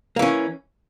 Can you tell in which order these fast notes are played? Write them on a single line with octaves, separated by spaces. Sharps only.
A#3 E3 C#4